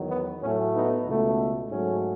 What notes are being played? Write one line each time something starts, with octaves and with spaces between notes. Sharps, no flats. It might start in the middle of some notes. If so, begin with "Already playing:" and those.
Already playing: E2 D#3 F#3
B3
A2 F#3 A3 C#4
B3 D#4
C#2 B2 A3
G#2 F#3 A3 C#4